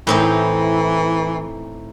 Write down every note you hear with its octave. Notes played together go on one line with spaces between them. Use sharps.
A2 E3 C4 D#4